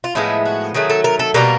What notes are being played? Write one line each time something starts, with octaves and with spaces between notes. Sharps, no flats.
F4
A2 F3 G#3 B3 E4
F#4
D#3 F#3 A3 G#4
A4
A#4
A4
B2 G3 A#3 A#4